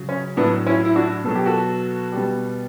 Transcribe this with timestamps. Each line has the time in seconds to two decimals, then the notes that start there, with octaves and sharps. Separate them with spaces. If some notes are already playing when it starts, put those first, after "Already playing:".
Already playing: C#3 F#3
0.09 C#4
0.37 A2 F#3 B3 D4
0.66 C#4 E4
0.85 E4
0.95 D4 F#4
1.25 B2 F#3 A4
1.35 G4
1.46 F#4 A4
2.12 B2 G3